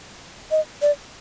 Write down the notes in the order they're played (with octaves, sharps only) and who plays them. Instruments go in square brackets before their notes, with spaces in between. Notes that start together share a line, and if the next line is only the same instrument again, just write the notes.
[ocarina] D#5
D5